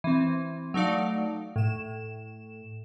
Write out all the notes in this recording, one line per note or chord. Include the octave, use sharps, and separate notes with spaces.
E3 C4
F#3 A3 D#4 D5 F5
A2 E7